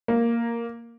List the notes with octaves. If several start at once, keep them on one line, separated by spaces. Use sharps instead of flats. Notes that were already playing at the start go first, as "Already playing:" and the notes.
A#3